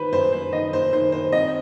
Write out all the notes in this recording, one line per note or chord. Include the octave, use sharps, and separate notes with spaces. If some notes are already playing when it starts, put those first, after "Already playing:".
Already playing: D#3 B4 C5
F#2 C5
C5
D#3 D#5
C5
D#3 C5
C5
C4 D#5